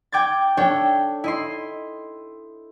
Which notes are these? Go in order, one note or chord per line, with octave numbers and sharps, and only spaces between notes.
G5 D6 G#6 A6
D4 A4 C#5 G5
E4 D#5 C6